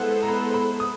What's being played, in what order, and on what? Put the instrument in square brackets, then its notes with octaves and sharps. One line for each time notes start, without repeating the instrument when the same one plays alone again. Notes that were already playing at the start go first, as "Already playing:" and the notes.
Already playing: [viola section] G#3 B3 E4 A4 C5 [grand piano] F#5
[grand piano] A#5
B5
B5
D#6